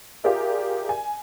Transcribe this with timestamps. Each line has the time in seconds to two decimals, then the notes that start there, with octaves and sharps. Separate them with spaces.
0.24 F4 G4 G#4 A#4 D5 E5
0.89 G#5